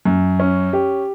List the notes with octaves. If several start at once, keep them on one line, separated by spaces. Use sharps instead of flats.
F#2
C#4
G4